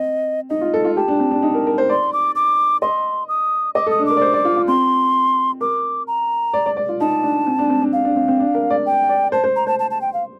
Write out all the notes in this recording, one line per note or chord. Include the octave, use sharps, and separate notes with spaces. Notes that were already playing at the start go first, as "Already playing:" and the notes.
Already playing: C4 D#5
D#4 D#5
F4
A4
F4
G4 A5
D4
C4
D4
D#4
A#4
A#4
C5
D5 C6
D6
D6
D#5 C6
D#6
D#5 D6
A4 D#6
D4
A#4 D6
D5
C5
D5
F4
F4
C4 C6
A#4 D6
A#5
D5
D5
D5
F4
D#4 A5
D4
C4
D4
C4
D4
D4 F5
D4
C4
C4
D4
A#4
D5
G5
D5
C5 A5
C5
A#5
C5 A5
A5
A5
G5
F5